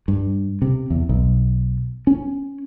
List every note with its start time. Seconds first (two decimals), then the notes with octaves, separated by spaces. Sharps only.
0.08 G2
0.62 C3
0.90 E2
1.09 B1
2.07 C#4